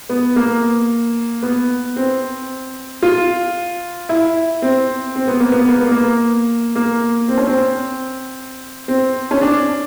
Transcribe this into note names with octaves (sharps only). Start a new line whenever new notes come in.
B3
A#3
B3
C4
F4
E4
C4
C4
B3
A#3
B3
A#3
B3
A#3
A#3
C4
C#4
C4
C4
C#4
D4